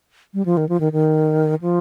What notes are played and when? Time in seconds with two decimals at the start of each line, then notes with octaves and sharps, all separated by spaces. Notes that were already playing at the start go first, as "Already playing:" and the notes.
0.34 G3
0.46 F3
0.57 D#3
0.69 F3
0.80 D#3
0.92 D#3
1.61 F3